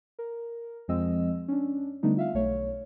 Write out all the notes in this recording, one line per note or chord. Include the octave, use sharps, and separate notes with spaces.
A#4
F2 F3 G#3 C4 D#5 E6
C#4 D4
D3 G3 A3 B3 D4 D#4
F4 E5 F5
B1 A3 C#5